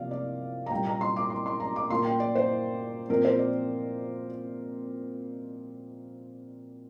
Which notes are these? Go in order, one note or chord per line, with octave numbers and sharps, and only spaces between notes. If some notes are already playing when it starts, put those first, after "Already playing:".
Already playing: C3 F3 A#3 D5 F5
D5
A#5
A#2 G3 A#3 G5
A#5
C6
D6
C6
C6
A#5
D6
A#2 A#3 C6
G5
D5
C5
A#2 F3 C4 A#4
C5
D5